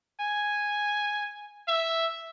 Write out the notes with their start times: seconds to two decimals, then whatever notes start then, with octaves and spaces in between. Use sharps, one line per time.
0.21 G#5
1.68 E5